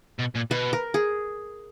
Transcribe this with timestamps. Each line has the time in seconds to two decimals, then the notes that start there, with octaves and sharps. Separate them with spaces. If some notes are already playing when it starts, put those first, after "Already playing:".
0.19 B2
0.35 A#2
0.51 B2 B4
0.73 A#4
0.94 G#4